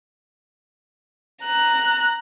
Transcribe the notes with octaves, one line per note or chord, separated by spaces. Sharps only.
A#5 F#6